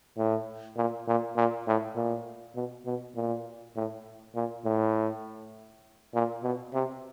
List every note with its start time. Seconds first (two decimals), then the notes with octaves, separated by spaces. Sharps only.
0.17 A2
0.77 A#2
1.08 A#2
1.37 A#2
1.67 A2
1.96 A#2
2.56 B2
2.86 B2
3.16 A#2
3.76 A2
4.35 A#2
4.65 A2
6.14 A#2
6.43 B2
6.74 C3